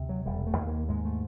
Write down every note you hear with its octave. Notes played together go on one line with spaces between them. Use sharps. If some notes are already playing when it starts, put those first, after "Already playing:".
Already playing: D2 C3
F#3
E1 G3
A3
D#2
A#3
G#2 G#3
A3